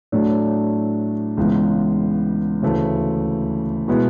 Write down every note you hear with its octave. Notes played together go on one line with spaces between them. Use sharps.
A2 F#3 A3 D4
C#2 C#3 E3 G#3 B3
D2 C#3 E3 A3
B2 G#3 B3 E4